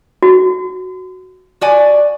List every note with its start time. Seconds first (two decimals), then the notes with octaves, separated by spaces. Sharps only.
0.22 F#4
1.61 F#4 D5 G#5